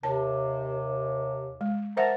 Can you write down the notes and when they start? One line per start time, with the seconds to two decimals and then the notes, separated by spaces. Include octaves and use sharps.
0.03 D#2 C3 A5
1.61 G#3
1.97 A#4 C5 E5 F#5 A5 A#5